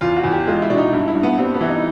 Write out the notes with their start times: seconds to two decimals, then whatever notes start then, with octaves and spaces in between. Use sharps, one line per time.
0.01 E2 F4
0.16 F#4
0.23 E2
0.31 G4
0.47 G#3 F4
0.62 E4
0.70 B2 D4
0.78 D#4
0.93 G2 E4
1.08 E4
1.15 G2
1.23 B3
1.38 G3 C4
1.54 B3
1.61 E3 E4
1.69 D#4